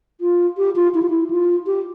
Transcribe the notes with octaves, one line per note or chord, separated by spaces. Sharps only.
F4
G4
F4
E4
F4
E4
F4
G4